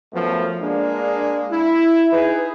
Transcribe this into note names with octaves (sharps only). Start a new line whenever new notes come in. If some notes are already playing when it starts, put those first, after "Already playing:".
F#2 F3 A3 B3
G#3 A#3 D4
E4
D#4 G#4 B4